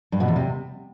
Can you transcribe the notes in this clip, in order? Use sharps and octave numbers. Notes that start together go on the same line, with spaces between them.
G2
B2
E2
C3